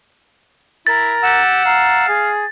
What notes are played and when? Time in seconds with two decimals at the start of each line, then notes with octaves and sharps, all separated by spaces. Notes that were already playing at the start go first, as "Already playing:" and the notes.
0.87 E4 A#4 A6
1.23 G4 F#5 E6
1.65 F5 A#5
2.07 G#4